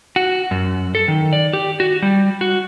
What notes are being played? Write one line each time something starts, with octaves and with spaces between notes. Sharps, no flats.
F#4
F#2
A4
D#3
D5
G4
F#4
G3
F#4